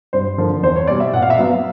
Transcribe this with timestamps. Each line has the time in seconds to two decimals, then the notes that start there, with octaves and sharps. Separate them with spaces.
0.13 G2 C5
0.38 D3 F3 A#3
0.63 E2 C5
0.76 C#5
0.87 B2 G3 D5
1.00 E5
1.13 A#2 F#5
1.22 F5
1.30 E5
1.38 F#3 B3 F5